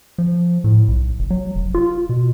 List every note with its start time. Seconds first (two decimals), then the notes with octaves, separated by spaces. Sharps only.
0.18 F3
0.64 A2
0.88 B1
1.19 F#1
1.30 F#3
1.56 F1
1.74 F4
2.09 B2